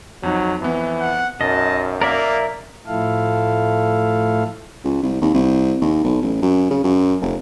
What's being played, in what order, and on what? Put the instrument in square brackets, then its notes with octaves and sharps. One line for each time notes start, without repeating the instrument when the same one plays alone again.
[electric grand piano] F2 D#4 [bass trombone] F#3
[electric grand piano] F2 B3 [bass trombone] E3
[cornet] F#5
[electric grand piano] B1 [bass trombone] F#2 [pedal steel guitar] D#5 [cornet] A5
[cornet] A#3 [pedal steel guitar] A#4 D5 E5
[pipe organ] A2 F3 A3 E4 A4 F5
[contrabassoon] C#2
C2
D#2
C2
D#2
B1
A1
F#2
C#3
F#2
F1